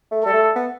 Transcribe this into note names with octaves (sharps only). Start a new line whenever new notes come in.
A3
G3 A4
A3
B3